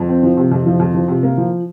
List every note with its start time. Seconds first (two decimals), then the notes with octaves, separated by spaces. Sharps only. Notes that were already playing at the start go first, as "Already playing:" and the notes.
Already playing: F2
0.09 C4
0.23 F3
0.37 C3
0.51 F2
0.66 F3
0.80 F2
0.94 F3
1.08 C3
1.23 A#3
1.38 F3